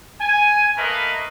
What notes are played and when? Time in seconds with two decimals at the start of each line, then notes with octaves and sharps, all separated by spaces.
0.21 G#5
0.77 A3 A#3 A#4 B4 D#5